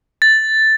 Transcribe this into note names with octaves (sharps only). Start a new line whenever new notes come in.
A6